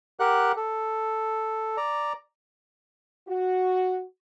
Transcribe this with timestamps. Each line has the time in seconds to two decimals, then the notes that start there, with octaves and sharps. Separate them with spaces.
0.20 G4 A#4 F#5 F#6
0.57 A4
1.77 D5 A#5
3.28 F#4